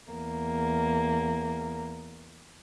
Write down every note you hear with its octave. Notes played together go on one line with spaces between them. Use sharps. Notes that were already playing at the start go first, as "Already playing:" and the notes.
E2 A#3